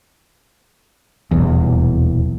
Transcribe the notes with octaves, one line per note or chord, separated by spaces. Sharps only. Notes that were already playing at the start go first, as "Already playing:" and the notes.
D#1 B1 E2